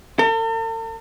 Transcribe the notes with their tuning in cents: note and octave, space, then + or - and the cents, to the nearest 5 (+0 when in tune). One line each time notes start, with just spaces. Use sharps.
A4 +45